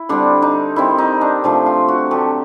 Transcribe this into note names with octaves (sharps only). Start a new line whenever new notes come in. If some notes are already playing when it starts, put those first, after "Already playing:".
Already playing: E4
D3 G3 C4 D4
D#4
D#3 G3 C4 E4
D#4
D4
C3 F3 A3 D4
F4
F#4
D3 F#3 A3 G4